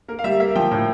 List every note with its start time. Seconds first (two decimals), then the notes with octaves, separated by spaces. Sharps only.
0.08 A#3 A#4
0.19 F5
0.24 G3 E5
0.40 A#3 E5
0.55 F3 G5
0.71 A2